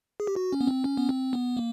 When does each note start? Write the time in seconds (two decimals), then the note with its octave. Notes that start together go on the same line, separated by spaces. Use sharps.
0.20 G#4
0.27 G4
0.36 F#4
0.53 C#4
0.61 B3
0.67 C4
0.84 C#4
0.97 B3
1.09 C4
1.33 B3
1.57 A#3